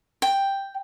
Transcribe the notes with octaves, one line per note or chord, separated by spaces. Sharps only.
G5